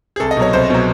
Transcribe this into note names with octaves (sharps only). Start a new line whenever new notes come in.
G#4
C2 A4
D#5
B2 F#3 C#5
C2 C5
B2 F#3